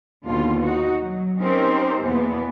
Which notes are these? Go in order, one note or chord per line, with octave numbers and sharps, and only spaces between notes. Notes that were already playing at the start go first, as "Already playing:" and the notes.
D#2 B2 D3 F4
D#4 F#4
F#3
C4 C#4 D#4 G4 A#4 C5
E2 B2 E3 A#3 B3